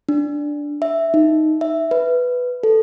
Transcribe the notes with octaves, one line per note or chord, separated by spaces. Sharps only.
D4
E5
D#4
E5
B4
A4